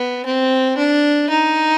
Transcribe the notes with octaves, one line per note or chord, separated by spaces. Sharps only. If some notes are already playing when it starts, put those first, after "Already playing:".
Already playing: B3
C4
D4
D#4